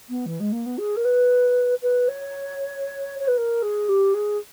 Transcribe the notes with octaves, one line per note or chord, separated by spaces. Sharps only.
B3
E3
G#3
A#3
B3
G#4
A#4
B4
B4
C#5
C#5
B4
A#4
G#4
G4
G#4